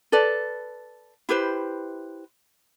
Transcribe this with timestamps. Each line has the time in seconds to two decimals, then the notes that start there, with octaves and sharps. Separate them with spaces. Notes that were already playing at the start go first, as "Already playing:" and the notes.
0.12 A4 B4 D5
1.29 E4 G4 B4 C5